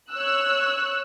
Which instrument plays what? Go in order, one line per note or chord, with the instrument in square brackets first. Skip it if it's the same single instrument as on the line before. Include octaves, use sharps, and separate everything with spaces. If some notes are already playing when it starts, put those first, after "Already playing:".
[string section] C#5 E6 F#6